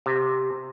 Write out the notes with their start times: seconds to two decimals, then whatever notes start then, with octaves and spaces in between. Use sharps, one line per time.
0.06 C3